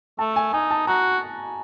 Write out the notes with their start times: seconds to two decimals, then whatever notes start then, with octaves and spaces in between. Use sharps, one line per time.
0.19 A3 A5
0.36 G#5
0.53 D#4 G#5
0.71 A5
0.87 F#4 A#5